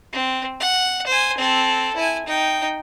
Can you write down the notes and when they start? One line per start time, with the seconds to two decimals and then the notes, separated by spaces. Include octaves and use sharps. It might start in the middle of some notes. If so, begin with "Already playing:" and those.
0.13 C4
0.60 F#5
1.07 C5 G#5
1.38 C4 A4
1.96 E4 G#5
2.26 D#4 G5